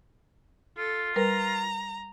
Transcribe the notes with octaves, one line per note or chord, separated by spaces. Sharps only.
F4 A4
G3 A#4 B4 A#5